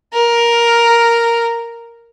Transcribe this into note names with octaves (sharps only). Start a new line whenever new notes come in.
A#4